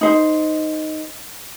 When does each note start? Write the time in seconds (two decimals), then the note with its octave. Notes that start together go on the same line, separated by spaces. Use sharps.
0.01 D#4 C5